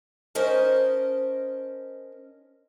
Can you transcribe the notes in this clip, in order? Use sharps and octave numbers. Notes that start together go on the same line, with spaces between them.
C#4 A#4 C5 D#5 A5